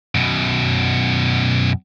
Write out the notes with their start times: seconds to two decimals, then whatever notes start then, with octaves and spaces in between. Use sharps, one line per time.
0.15 F#2 B2